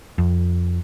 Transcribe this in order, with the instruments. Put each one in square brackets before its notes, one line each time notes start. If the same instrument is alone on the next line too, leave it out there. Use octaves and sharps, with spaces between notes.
[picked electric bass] F2